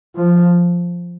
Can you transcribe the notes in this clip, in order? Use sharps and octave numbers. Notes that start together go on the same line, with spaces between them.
F3